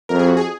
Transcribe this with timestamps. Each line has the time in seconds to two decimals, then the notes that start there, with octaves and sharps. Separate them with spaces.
0.09 F2 A#4
0.19 G#4
0.28 F#4
0.37 G#4